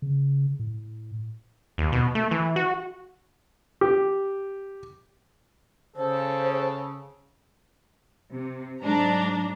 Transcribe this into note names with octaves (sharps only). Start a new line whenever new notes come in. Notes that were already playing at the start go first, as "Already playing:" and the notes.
C#3
A2
D#2
B2
A3
E3
F#4
G4
C#3 A4 C5
C3
G#2 F#3 D4 A#5